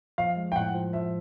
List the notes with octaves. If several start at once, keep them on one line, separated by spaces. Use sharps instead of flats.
F3 F5
G#3
G5
A2 F#5
F3
F3 E5